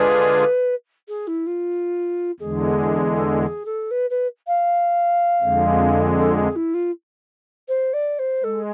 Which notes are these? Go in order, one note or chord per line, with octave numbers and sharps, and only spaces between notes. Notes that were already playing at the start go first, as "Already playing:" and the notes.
Already playing: D3 G#3 D4 F4 G#4 B4
G#4
E4
F4
E2 D3 G#3 G#4
A4
G#4
A4
B4
B4
F5
F2 D3 G#3
A4
G#4
E4
F4
C5
D5
C5
G#3 A4